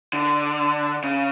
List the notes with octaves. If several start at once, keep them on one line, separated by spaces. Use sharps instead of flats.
D3
C#3